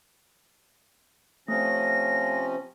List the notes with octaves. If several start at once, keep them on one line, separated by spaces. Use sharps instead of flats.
C3 F3 A3 C#4 A#6